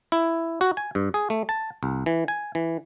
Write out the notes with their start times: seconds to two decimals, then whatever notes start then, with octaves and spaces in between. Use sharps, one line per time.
0.12 E4
0.61 F#4
0.77 G#5
0.95 G2
1.14 G#4
1.30 A3
1.49 A5
1.83 C2
2.06 E3
2.28 G#5
2.55 E3